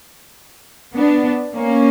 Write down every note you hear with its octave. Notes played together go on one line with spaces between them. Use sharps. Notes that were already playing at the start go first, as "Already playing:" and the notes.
B3 D4
A#3 C#4